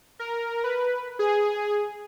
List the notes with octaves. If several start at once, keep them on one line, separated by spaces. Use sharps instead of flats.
A#4
B4
G#4